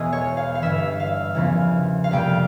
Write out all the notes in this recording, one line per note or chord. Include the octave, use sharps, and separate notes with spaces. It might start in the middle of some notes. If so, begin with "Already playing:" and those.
Already playing: E1 E2 E3 G#3 G#4
C#5
F5
F5
G1 G2 E3 E5
F5
E2 C#3 F3 A#3
F5
F2 C3 G3 A#3 G5